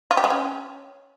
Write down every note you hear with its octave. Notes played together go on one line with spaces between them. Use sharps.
F4
G4
G#3
C#4